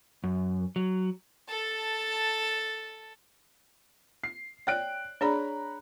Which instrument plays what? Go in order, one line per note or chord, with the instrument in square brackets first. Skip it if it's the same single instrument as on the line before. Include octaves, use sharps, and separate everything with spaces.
[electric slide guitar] F#2
F#3
[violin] A4 A5
[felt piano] C7
[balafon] C#5 D5 [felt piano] G5 F#6 D7
[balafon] D4 G#4 D5 [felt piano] C#5 A#5 B5